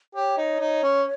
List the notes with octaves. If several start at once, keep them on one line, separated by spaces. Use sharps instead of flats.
G4 C#5
D#4
D#4
C#4